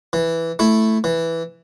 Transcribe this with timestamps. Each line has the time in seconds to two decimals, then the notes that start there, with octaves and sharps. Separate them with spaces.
0.13 E3
0.59 A3 E4
1.04 E3